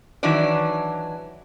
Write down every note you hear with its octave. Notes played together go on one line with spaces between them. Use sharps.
D#3 E3 F#3 D4 D5